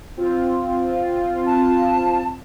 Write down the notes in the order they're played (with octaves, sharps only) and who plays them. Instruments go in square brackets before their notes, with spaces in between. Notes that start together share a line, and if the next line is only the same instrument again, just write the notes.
[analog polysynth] C4 F4
[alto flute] A5